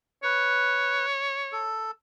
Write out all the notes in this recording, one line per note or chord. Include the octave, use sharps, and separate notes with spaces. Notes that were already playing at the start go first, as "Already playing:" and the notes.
B4 C#5
A4